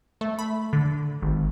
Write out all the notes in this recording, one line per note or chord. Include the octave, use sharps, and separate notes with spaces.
A3
B5
D3
G#1